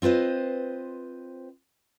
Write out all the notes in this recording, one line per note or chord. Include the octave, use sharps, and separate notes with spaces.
C4 F4 B4 C5 D#5